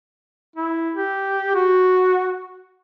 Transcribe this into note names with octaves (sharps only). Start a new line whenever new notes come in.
E4
G4
F#4